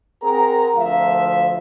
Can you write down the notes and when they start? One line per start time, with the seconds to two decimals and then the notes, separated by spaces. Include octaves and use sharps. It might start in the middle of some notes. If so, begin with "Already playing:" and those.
0.23 C4 G#4 A#4 F#5 A#5
0.75 D2 F3 E5 F5